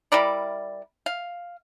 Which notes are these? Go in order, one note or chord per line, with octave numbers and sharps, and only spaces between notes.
G3 E4 A#4 D5
F5